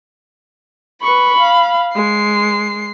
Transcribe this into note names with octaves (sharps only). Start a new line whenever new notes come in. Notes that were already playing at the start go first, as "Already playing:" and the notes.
B4 B5 C#6
F5
G#3 C7